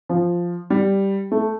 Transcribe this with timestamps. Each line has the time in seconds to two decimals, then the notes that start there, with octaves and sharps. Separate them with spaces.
0.09 F3
0.70 G3
1.32 A3